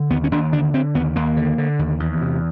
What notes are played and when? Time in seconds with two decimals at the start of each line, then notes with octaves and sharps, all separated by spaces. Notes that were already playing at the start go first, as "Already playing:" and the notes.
Already playing: D3
0.10 D#2 B3
0.24 C#4
0.31 D#2 D4
0.52 D3 D4
0.74 D3 C4
0.95 D#2 B3
1.16 D#2 A#3
1.37 D3
1.58 D3
1.79 D#2
2.00 E2
2.21 C3